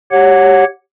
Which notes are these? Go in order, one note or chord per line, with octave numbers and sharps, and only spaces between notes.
G4 C#5 F#5